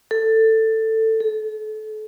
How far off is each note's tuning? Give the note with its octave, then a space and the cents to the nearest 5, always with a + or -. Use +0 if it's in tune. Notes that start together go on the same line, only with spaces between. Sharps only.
A4 +15
A4 -30